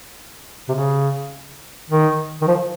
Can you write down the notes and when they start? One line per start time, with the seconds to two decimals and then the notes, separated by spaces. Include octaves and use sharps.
0.69 C3
0.75 C#3
1.90 D#3
2.42 D#3
2.47 F3